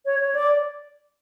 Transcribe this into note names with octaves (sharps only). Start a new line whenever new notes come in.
C#5
C#5
D5